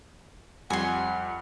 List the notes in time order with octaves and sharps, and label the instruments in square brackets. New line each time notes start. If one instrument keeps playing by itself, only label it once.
[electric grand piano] F2 G3 [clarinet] F#5 [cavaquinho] G#5 C6